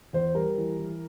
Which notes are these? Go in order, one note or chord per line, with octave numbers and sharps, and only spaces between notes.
E2 C5
G3 A#4
E3
E3